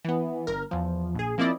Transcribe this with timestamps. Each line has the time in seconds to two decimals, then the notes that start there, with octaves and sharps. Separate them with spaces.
0.05 E3 B3
0.47 G1 A#4
0.71 E2 F3
1.15 A#1 G#4
1.38 F3 A#3 C4 E4 D5 D#5